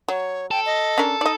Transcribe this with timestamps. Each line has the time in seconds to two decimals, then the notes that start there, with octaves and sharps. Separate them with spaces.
0.08 F#3 C#5
0.51 A4 G5
0.66 D#5
0.98 C#4 D4 A#4
1.21 D#4 D5 D#5